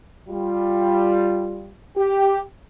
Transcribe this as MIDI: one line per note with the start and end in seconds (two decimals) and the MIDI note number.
0.29 1.76 55
0.29 1.76 65
1.96 2.40 67